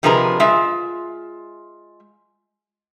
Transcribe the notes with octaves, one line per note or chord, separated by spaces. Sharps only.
C3 F3 G#3 G#4 A#4 B4
G#3 F4 E5